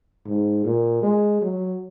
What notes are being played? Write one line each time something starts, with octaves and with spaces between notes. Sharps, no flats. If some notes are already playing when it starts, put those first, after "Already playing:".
G#2
A#2
G#3
F#3